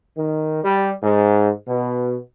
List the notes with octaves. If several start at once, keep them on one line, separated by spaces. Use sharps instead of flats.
D#3
G3
G#2
B2